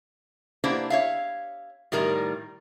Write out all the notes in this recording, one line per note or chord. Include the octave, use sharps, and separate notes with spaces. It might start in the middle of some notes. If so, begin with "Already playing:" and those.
A#3 B3 D4 E4 G4 C5
C#5 E5 F5
A2 D#3 G3 A#4 D5 A#5